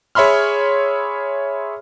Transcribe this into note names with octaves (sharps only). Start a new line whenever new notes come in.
G#4 C#5 E5 B5 C6 F6